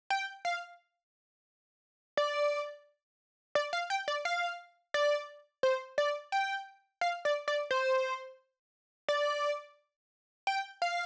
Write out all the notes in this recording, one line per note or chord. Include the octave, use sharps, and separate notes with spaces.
G5
F5
D5
D5
F5
G5
D5
F5
D5
C5
D5
G5
F5
D5
D5
C5
D5
G5
F5